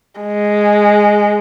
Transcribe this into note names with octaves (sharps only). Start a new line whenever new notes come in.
G#3